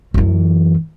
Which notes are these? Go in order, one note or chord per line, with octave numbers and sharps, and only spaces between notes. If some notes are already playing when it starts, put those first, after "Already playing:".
F#2 E3